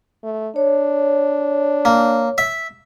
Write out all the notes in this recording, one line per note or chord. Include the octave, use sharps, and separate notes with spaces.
A3
D4 C#5
A#3
E5